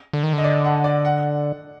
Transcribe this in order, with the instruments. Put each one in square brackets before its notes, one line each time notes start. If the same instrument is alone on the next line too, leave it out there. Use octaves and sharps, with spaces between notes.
[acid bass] D3
D#3
D3
[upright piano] D#5
D5
F#5
D5
F#5